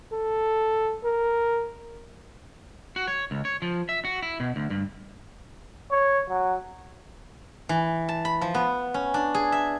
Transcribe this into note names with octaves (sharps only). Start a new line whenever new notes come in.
A4
A#4
F#4
C#5
C#2
C#5
F3
E5
F#4
E4
B2
D2
G2
C#5
F#3
E3
A5
B5
F3
B3
C#4
D4
G#4
E5